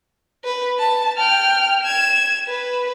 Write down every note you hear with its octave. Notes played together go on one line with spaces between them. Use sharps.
B4
A5
G5 F6
G#6 E7
B4